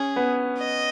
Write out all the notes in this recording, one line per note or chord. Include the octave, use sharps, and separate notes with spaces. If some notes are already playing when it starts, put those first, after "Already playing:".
Already playing: C#4 G#4
B3
D#5